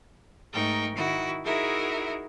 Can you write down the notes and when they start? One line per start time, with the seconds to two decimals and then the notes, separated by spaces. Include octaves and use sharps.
0.51 G#2 A3 D#4 A#4 G5 C#6
0.93 D#3 E4 F#4
1.43 D#4 E4 F#4 G#4 A#4 E5